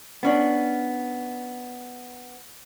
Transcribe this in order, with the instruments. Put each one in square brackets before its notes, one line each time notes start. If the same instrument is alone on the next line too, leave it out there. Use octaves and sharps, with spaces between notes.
[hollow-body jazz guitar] B3 C#4 D4